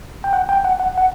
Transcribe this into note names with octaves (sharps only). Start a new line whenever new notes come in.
G5
F#5
G5
F#5
F#5
F#5